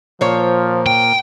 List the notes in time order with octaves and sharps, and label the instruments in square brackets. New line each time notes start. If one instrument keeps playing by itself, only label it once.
[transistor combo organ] A#2 [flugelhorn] F3 [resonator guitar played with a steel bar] C5 C#5
[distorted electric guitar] G5